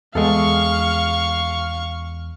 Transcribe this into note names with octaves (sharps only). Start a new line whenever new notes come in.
E2 G#3 A4 F5 C#6